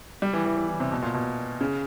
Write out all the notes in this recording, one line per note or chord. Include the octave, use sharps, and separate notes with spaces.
G3
E3
E3
E3
E3
C3
B2
A#2
B2
C#3